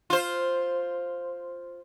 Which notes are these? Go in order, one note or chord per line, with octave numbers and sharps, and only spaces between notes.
F4 C5